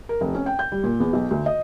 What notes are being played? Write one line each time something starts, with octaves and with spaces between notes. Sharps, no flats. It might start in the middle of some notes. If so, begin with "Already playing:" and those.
A#4
F1
C#4
G5
G6
G3
A#2
E2
B1
D2
D#5